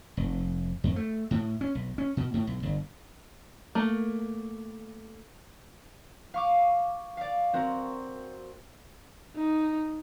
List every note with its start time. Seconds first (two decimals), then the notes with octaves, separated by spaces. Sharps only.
0.17 F1
0.84 F2
0.96 A3
1.31 A2
1.61 C#4
1.75 B1
1.98 C#4
2.17 B2
2.34 A2
2.47 B1
2.63 G1
3.75 A3 A#3
6.34 F5 C#6 D6
7.17 D5 F5
7.53 C4 F#4 A#4
9.36 D#4